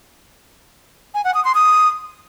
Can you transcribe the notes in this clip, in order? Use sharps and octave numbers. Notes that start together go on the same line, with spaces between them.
G#5
F#5
D#6
C6
D#6